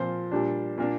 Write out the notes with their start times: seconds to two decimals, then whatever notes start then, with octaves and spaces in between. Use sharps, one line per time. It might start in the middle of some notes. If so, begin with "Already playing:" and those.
Already playing: A#2 F3 C4 C5
0.31 A#2 G3 D4
0.78 A#2 A#3 D4